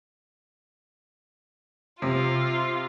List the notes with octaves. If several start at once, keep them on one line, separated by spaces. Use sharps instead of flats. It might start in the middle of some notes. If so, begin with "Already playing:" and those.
C3 F4